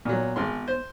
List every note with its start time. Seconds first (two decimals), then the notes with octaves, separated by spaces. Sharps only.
0.05 A#2 F#3 B3
0.36 G#1 G#3 C6
0.68 C5